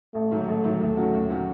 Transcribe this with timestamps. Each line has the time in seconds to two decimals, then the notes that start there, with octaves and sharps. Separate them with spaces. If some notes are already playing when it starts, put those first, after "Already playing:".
0.14 A1 A3
0.31 G#2 D#3 F#3
0.47 A1 A3
0.64 G#2 D#3 F#3
0.80 D#2 A3
0.97 D#3 F#3 C#4 F#4
1.14 D#2
1.30 D#3 F#3 C#4 F#4